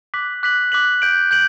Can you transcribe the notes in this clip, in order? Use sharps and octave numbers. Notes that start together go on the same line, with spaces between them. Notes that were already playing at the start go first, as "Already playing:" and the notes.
D6 F#6 B6 F#7
D6 F#6 B6 F#7
D6 F#6 B6 F#7
G6 D7 F#7
G6 D7 F#7